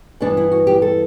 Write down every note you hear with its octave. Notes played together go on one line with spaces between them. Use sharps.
G2 E3 B3 D4
E4
F#4
G4
A4